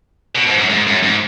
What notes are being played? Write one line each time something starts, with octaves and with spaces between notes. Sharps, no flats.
B2
G#2
F#2
G#2
F#2
G#2